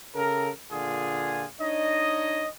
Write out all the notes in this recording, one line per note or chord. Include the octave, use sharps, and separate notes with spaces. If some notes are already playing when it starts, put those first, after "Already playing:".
C#3 A4 A#4
A#2 D3 F4 G#4
D4 D#4 C#5 D#5